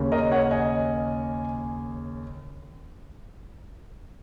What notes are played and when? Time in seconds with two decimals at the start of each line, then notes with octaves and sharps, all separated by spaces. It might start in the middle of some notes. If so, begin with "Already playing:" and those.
Already playing: D#2 C#3
0.12 A#4 D#5
0.31 C#5 F#5
0.51 D#5 G#5